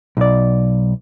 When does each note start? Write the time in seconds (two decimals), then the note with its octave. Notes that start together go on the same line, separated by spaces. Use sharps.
0.17 B1 D5